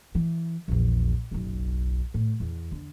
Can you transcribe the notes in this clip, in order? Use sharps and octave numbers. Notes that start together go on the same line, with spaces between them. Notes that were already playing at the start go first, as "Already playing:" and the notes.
E3
A#1 E2
F#1 B1
A2
E2
D3